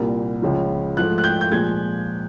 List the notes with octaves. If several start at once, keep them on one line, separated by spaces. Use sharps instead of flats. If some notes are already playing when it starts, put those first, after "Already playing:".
Already playing: C2 A#2 G3 A#3
C#2 C#3 F3
G#2 F3 A3 F#6
F#6
G6
G6
A#2 F3 G#3 G#6